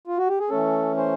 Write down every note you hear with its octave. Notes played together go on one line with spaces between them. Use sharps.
F4
F#4
G4
G#4
E3 A3 C#4 A4
C5